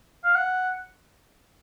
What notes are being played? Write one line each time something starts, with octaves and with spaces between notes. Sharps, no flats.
F5
F#5